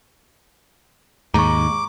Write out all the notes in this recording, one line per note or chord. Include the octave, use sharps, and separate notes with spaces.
D#2 G#2 A#5 C#6 D6